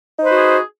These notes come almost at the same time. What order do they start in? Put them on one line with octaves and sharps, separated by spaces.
D#4 C5 B4 F#4 G#4